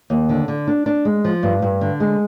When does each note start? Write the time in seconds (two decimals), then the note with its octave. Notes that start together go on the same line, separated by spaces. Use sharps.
0.10 D#2
0.29 D3
0.48 D3
0.67 D4
0.86 D4
1.05 G#3
1.25 F3
1.43 G2
1.62 G2
1.81 D3
2.00 G#3